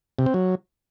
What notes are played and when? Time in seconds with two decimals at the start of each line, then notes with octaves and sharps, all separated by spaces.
0.19 C3
0.26 C4
0.34 F#3